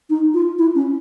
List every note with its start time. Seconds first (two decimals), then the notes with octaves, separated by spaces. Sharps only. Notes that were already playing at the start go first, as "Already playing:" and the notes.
0.10 D#4
0.34 F4
0.59 E4
0.75 C#4